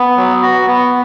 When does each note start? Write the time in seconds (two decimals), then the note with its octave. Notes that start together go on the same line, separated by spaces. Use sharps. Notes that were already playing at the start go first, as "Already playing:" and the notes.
Already playing: B3
0.17 F#3
0.42 F#4
0.67 B3